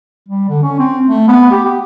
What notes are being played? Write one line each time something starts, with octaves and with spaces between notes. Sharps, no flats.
G3
D3
C#4
C4
A3
B3
G4
G4